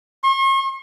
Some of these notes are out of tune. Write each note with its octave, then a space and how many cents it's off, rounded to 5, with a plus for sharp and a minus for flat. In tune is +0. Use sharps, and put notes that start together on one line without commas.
C#6 -45